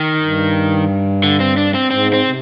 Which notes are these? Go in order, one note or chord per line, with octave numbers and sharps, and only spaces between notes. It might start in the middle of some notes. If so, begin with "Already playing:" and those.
Already playing: D#3
G2
D3
C4
D4
C4
G#2 C4
C4
C3